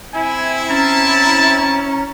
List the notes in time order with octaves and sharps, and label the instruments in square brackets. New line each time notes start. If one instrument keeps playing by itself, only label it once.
[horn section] C4 E4 [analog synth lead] G#5
[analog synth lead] C#4 [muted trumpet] A5 [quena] A#5